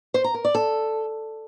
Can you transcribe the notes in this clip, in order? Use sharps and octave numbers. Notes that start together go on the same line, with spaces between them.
C5
A#5
A#4
D5
A4